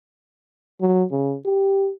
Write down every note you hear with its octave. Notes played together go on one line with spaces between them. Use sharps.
F#3
C#3
G4